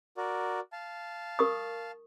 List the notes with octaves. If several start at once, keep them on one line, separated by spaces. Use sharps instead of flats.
F#4 A#4 D5
F5 A5
A#4 C#6 D#6